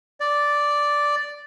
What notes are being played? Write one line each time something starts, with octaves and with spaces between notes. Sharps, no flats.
D5